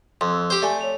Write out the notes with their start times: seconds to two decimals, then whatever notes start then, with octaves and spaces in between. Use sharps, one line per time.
0.21 F2 C6
0.32 E6
0.50 G4 C5
0.62 A3 D5 G#5 G7
0.81 C#5 F7